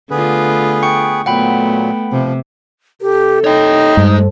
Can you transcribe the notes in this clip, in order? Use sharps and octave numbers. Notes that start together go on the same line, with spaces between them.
D3 A3 B3 F4 G#4 B4
G5 C#6 C#7
A#2 F#3 A3 B3 F#5 G5 B5
C3 F3
C3 G4 A4
D#4 C#5 G5
G2 G#3 A4 C5